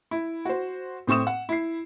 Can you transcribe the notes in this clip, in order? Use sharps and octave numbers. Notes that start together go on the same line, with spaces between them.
E4
F#4 C5
A2 C4 C#6 D#6 E7
F#5
E4 C7